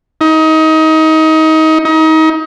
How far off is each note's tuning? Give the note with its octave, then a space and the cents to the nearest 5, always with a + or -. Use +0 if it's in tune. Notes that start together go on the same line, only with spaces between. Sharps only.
D#4 +25
D#4 +30